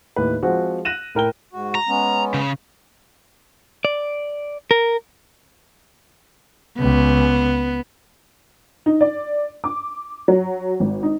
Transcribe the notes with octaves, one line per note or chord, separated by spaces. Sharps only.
D#2 A2 B4
F3 G#3 C4 F#4
F#6 A#6 D#7 E7 F#7
A2 A#4 G5 G7
G#2 F#4
A#5
G#3 B3 C#4
C#3
D5
A#4
C#2 B3
D#4
D5
D6
F#3
G#1
D#4